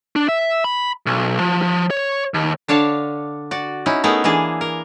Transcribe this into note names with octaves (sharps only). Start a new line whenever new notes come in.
D4
E5
B5
B1
F3
F3
C#5
D#2
D3 D4 C#5 F5 A5
F#4 D5
C#4 D#4 E4
A3 B3 D#4 E4 G#4 A#4
E3 A#3 D4 G#4
A#4